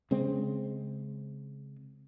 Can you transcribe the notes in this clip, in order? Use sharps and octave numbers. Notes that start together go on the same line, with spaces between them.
C#3 G#3 C4